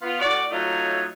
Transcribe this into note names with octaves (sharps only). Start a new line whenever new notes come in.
B3 F4
A2 F#4 D5
F#3 A3 D#4 F4 C#5